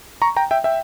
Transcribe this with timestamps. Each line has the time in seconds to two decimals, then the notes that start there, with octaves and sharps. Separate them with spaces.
0.22 A#5 C#6
0.36 G5 A#5
0.51 E5 G5
0.64 E5 G5